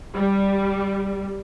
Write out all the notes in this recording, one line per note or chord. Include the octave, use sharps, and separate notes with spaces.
G3